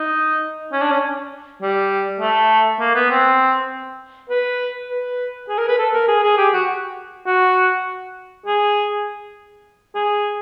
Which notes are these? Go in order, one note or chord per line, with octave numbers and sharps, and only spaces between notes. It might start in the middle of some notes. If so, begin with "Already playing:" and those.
Already playing: D#4
C#4
D4
C#4
G3
A3
A#3
B3
C4
B4
B4
G#4
A#4
B4
A4
A#4
G#4
G#4
G4
F#4
F#4
G#4
G#4